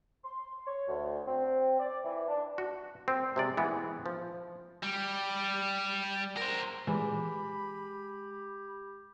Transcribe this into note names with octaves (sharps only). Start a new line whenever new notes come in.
C6
C#5
D2
C4
D5
E3
D4
F#4
C4
C3 G#3 D5
E3 G#3 B3
F3
G3
A#4 C5
A#2 E3 G#3 G4 B5